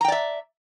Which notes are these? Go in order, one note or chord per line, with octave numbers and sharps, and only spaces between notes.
D5 E5 G5 A#5